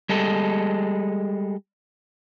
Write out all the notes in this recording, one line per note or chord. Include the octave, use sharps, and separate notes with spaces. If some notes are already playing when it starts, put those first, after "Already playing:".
G3 G#3 A4